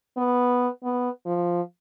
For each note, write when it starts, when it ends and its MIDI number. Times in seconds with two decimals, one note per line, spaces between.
0.17 0.68 59
0.84 1.09 59
1.26 1.61 53